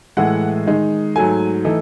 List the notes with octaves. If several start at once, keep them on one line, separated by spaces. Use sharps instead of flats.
A2 E3 G#3 F#5
D#3 G#3 D#4
G#2 F#3 A3 G#5
E3 A3 D#4